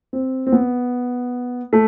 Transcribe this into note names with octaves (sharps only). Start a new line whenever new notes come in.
C4
C4
B3
A3